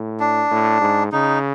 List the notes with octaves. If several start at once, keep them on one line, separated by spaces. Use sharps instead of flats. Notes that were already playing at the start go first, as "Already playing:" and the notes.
Already playing: A2
D4
A2
G#2
C#3 D#4